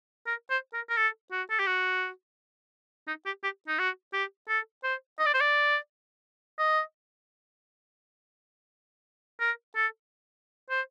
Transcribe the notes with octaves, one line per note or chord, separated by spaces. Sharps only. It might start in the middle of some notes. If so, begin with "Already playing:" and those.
A#4
C5
A#4
A#4
A4
F#4
A4
G4
F#4
D#4
G4
G4
D#4
F#4
G4
A4
C5
D#5
D5
C5
D5
D#5
A#4
A4
C5